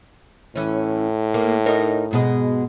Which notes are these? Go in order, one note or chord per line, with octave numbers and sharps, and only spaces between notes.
A2 E3 C#4
A#3
D#4 A#4 C#5
G#2 B2 G#3